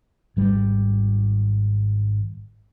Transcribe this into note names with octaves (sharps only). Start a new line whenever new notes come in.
G#1 G3